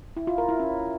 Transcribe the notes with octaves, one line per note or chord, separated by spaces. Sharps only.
E4
F4
A#4
E4
C#4